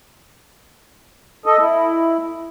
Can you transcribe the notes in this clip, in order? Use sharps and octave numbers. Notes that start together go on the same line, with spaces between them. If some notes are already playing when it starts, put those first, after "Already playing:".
A4 D#5
E4